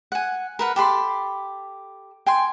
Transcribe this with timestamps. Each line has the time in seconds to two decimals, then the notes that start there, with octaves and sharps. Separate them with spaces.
0.12 F#5 G#5
0.59 A#4 B4 F#5
0.76 G4 A4 B5 C6
2.26 G5 G#5 C6